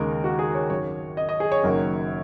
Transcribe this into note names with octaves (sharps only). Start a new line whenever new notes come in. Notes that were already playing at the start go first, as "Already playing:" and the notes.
Already playing: D#2 C#3 G#3 A#4
F#4
G#4
C#5
G#1 F#2 F#3 C#5
D#5
D#5
G#4
C#5
F#1 F#2 D#3 F#3 A#3